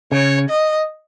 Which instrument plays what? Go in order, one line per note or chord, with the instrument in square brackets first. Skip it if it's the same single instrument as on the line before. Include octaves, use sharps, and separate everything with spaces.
[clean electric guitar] C#3 [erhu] C#5
[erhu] D#5